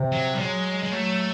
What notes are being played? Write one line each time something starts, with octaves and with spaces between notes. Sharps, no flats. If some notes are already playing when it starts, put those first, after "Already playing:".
Already playing: C3
F#3
G3
F#3 G#3
G#3
F#3 A3